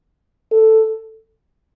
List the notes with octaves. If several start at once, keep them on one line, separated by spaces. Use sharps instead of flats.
A4